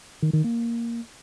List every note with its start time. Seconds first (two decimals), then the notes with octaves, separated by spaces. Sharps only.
0.22 D#3
0.33 D#3
0.44 A#3